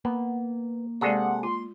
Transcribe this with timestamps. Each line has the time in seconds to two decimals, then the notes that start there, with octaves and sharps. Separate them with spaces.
0.05 A#3 B3
1.01 C3 G#3 G#4 A4 D5 F#5 C#6
1.43 F4 C6